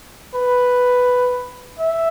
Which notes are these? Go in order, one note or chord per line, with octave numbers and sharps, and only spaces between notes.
B4
E5